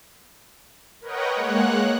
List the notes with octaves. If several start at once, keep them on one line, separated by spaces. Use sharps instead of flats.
A#4 B4 C#5 D#5 F#5 G5
G#3 A#3 C#5 F#5 F#6